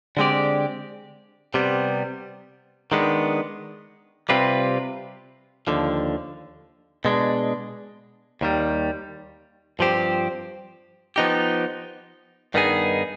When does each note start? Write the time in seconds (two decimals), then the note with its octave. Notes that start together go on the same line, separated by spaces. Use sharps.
0.17 D3 G#3 C4 G4 D5
1.54 C3 G3 B3
2.92 D#3 G#3 B3 D4
4.29 C3 G3 C4 F4 B4
5.67 D#2 D3 F3
7.05 B2 G#3 D4
8.41 D#2 D#3 G3
9.79 G2 F3 C4 G4 C5
11.16 F3 B3 D#4 G4
12.54 G2 D#3 B3 D#4 G#4